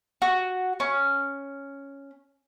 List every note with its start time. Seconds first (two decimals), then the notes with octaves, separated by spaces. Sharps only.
0.22 F#4
0.80 C#4